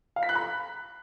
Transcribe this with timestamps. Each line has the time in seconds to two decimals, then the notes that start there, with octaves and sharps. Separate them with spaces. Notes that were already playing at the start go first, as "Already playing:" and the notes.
0.16 F5
0.23 B6
0.29 F#6
0.35 B5